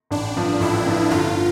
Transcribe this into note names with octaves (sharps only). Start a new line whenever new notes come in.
A1 D4
G2 F3
A1 E4
G2 F3
G1 F4